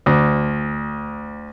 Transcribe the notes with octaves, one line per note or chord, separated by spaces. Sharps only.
D2